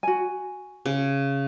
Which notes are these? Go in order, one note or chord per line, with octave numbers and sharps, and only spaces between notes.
F#4 G#5
C#3